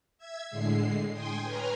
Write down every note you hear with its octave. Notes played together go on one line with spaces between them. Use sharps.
E5 E6 G#6
A2 D3 G#3 C7
G5 G#5 C6 D#6
B4 C#5 G#5 A#5 F6